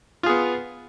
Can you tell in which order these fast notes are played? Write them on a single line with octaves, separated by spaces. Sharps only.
F4 G#4 B3